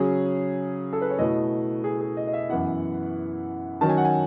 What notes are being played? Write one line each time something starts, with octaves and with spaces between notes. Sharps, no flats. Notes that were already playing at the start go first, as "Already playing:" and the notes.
Already playing: C#3 F#3 C#4 G#4
A4
B4
C#5
B2 A3 E4 D#5
G#4
G#4
D#5
D#5
E5
F#2 E3 B3 E4 F#5
D#3 F#3 C#4 A5
G#5
F#5
G#5